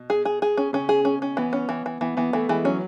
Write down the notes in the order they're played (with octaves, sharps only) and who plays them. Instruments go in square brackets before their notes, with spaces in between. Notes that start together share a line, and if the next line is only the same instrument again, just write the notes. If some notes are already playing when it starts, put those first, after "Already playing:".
Already playing: [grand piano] B2
[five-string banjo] G#4
G#4
G#4
C#4
[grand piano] C#3 [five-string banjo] C#4
[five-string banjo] G#4
C#4
C#4
[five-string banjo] E3 [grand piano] B3
[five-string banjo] C#4
E3
E3
[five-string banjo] E3 [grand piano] B3
[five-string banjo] E3 [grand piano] B3
[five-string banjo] E3 [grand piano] A3
[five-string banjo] E3 [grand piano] G#3
[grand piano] F#3 [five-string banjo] C#4